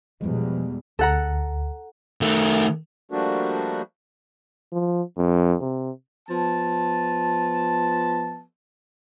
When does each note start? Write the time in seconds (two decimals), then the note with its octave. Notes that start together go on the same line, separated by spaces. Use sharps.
0.21 E2 B2 F3 G3 G#3
0.99 D2 A4 F#5 A#5
2.21 D#3 A3
3.12 F3 G3 A3 A#3 D4 F#4
4.73 F3
5.17 F2
5.61 C3
6.28 F3 B3 A5